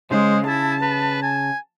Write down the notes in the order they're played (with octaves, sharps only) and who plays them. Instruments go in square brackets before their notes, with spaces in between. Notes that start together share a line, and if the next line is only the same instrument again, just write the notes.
[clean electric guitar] C#3 [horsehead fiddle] G#3 [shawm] C5
[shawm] E4 [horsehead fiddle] A5
[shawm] B4
G#5